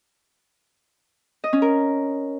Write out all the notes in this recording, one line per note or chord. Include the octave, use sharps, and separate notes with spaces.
D#5
C#4
A#4